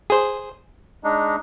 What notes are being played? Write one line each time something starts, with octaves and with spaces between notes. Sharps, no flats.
G#4 C5
G#3 D4 D#4